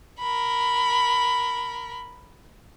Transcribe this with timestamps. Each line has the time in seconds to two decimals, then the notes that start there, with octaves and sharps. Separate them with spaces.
0.20 A#4 B5